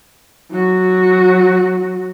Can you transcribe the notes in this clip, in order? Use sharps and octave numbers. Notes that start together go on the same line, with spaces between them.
F#3 F#4